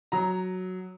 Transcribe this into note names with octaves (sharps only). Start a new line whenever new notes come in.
F#3 A#5